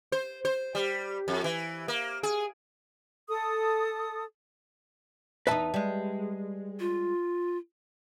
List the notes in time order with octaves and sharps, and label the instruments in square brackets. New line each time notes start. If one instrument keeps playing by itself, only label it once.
[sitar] C5
C5
G3
F2
E3
A#3
G#4
[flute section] A4 D#6
[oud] E2 D#4 [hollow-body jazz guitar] B4 E5 A5
[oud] G3 G#3
[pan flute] F4